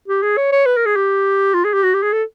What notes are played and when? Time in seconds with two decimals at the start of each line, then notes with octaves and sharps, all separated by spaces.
0.08 G4
0.23 G#4
0.37 C#5
0.52 C#5
0.66 B4
0.77 A#4
0.86 G#4
0.96 G4
1.54 F4
1.64 G#4
1.73 G4
1.83 F#4
1.94 G4
2.03 G#4
2.13 A4